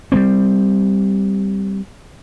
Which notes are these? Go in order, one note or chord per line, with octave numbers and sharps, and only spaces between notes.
G3 A#3 C4